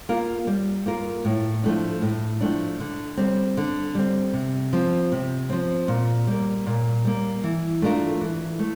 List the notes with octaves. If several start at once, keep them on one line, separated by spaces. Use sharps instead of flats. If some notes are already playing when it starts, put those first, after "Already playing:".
A#3 F4 A#4
G3
A#3 F4 A#4
A2
F3 A3 D4
A2
F3 A3 D4
D3
G3 C4
D3
G3 C4
C3
F3 C4
C3
F3 C4
A#2
G3 A#3
A#2
G3 A#3
E3
A3 D4 F4 A#4
E3
A3